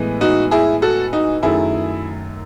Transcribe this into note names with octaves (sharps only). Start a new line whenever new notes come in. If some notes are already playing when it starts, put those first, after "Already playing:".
Already playing: A2 E3 G#3 B3
D#4 F#4
E4 G#4
F#4 A4
D#4 F#4
F#2 D#3 F#3 A3 E4 G#4